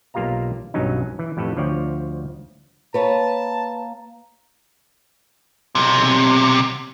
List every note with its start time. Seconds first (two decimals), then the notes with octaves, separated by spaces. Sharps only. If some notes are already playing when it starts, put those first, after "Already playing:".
0.14 B1 A#3 F4 G4 F5 A#5
0.74 B1 G2 F#3 C#4 D#4
1.19 E3
1.37 F2 A2 G4 A4 B4
1.57 D2 F3 C#5 D5 G5
2.94 A#3 B4 C#5 F5 A5 A#5
5.75 B1 C3